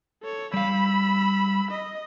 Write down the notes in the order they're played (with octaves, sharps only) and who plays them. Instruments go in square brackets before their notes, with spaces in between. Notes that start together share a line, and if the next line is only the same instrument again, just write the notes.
[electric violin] A4 C#5
[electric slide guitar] G3 F5 [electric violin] B5 E6
[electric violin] D#5